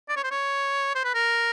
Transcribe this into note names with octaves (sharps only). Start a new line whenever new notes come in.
D5
C#5
C5
C#5
C5
B4
A#4